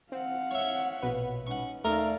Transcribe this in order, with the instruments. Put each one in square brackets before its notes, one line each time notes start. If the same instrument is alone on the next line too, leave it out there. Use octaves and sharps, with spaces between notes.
[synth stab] C4 [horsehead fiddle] F5 F#5
[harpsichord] C#5 E5
[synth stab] A#1 B2 B4
[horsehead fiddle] C#4 D#4 [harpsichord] F#5 C#6
[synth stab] D#2 A#5 [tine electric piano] A3 [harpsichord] D#4 A#4 [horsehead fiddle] D5 F5